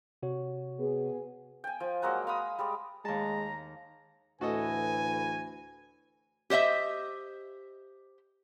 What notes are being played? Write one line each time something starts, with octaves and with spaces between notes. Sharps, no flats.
C3 F#4 C#5
B3 G#4
G5 G#5
F3 G#5
F#3 G#3 A#3 F#5
F5 B5 D#6
G3 G#3 D5
D#2 G#3 A5 A#5
D2 A2 E3 F#4 A4 B4 D#5 G#5
G4 C5 D#5 E5